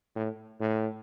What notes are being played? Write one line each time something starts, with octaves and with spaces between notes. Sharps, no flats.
A2
A2